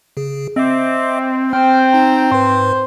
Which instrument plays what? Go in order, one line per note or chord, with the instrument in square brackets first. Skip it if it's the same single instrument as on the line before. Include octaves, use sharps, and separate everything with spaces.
[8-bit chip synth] C#3 G#4
[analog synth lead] C4 [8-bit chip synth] D#5 E5 D6
[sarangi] C4 [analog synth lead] G5 [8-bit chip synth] F6
[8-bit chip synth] D#4 A#5
[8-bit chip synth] G#2 B4 [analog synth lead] C5